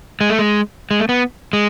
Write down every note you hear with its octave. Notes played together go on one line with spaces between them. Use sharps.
G#3
A3
G#3
G#3
A3
B3
G#3